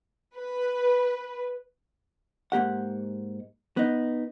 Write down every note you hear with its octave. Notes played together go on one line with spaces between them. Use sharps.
B4
G#2 A#3 G4 F#5
B3 D#4